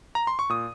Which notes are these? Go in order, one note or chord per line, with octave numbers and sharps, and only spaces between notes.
A#5
C6
C#6
A#2 D#6